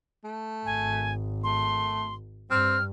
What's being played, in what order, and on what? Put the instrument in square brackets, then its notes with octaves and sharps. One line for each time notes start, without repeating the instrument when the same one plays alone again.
[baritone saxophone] A3
[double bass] G#1 [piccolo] G#5
[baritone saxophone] A3 [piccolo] C6
[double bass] G2 [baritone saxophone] C4 [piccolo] F6